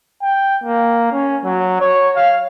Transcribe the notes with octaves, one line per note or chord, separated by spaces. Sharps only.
G5
A#3
C#4
F#3
C#5
F5